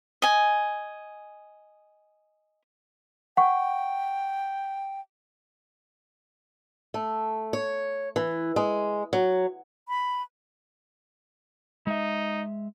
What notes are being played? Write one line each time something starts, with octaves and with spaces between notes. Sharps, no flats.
D#5 G#5
F#5 G5 C#6
A3
C#5
E3
G#3
F#3
B5
G#3 D#4 E5